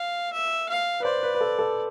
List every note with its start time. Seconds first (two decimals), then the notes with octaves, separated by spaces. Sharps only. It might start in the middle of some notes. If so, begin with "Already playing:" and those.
Already playing: F5
0.33 E5
0.69 F5
1.00 B4
1.04 C5 D5
1.23 B4
1.34 B4
1.41 A4
1.59 A4